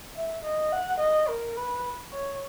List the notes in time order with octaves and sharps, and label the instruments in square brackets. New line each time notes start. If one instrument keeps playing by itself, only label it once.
[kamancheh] E5
D#5
F#5
D#5
A#4
B4
C#5